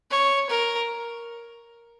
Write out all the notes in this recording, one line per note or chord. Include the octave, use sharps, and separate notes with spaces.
C#5
A#4